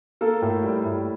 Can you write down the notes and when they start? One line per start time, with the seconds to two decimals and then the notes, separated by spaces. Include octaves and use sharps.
0.21 A#3 A4
0.42 A2
0.64 G3
0.85 A2